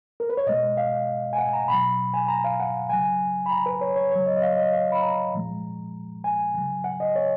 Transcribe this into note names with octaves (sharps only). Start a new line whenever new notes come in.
A#4
B4
C#5
B2 G#3 D#5
F5
G#5
F#5
A#5
B2 F#3 B5
G#5
A#5
F5
F#5
C#3 F#3 G#5
B5
A#5
B4
C#5
C#5
C#3 F#3 C#5
D#5
D#5
F5
D#5
F5
B5
A#5
A#2 F3 G#3
G#5
C#3 F#3
F#5
D#5
C#5